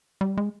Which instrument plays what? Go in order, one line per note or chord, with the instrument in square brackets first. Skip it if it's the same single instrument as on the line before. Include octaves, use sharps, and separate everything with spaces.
[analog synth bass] G3
G#3